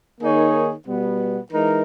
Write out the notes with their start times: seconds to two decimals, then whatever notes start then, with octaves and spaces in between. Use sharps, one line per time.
0.21 D#3 A#3 D#4 G#4 C#5
0.86 B2 G3 B3
1.52 E3 G#3 D#4 A#4